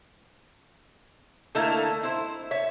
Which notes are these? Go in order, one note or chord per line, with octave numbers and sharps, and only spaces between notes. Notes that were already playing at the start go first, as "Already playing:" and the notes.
D3 A3 A#3 D#4 E4 A4
E4 C5
C#5 E5